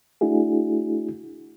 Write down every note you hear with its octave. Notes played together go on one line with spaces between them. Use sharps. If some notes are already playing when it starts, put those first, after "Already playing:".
A3 D4 E4 F#4 G#4